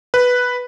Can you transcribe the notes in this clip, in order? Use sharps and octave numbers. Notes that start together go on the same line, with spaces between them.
B4